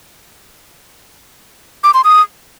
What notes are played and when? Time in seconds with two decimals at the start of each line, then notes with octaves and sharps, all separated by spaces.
1.84 D6
1.94 C6
2.04 D#6